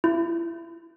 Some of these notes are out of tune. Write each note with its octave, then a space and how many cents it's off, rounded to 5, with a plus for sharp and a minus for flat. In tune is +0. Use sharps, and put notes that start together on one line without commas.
E4 +30